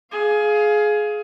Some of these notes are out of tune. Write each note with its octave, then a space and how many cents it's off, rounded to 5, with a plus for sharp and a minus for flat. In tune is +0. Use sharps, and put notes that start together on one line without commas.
G#4 +20 F5 +0